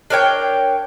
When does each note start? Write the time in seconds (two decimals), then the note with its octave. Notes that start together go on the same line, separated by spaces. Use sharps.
0.10 D4 A#4 C#5 G5